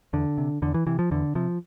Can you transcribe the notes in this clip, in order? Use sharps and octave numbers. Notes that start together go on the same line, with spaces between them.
E2 D3
C3
E2 D3
E3
C3 E3
F3
E2 D3
C3 F3